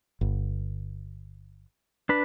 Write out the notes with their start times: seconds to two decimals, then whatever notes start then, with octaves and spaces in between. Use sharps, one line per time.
0.21 G1
2.09 D4 B4